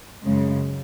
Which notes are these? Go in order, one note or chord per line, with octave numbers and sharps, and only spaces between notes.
F#2 C#3 G#3